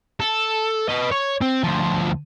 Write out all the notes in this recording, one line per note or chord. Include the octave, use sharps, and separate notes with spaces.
A4
B4 D#5
C#5
C4
D2 F3